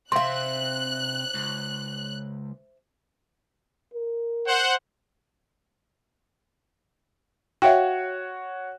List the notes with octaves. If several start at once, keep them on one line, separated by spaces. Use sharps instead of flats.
C3 C5 E5 F5 C6 F#6
C#2
A#4
C5 F#5
F#4 C#5 E5 F5 G5